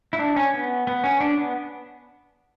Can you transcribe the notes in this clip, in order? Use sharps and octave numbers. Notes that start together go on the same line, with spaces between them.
E4
D4
C#4
B3
B3
C#4
D4
B3